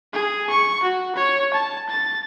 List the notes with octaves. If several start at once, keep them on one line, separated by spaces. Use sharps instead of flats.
G#4
C#6
F#4
C#5
A5
A6